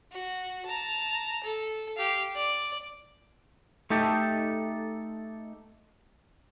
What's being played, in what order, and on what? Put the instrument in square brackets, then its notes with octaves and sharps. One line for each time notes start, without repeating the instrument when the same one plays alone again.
[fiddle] F#4
A5 A#5
A4
G4 F5
D5
[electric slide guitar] A3 D#4 G4 A4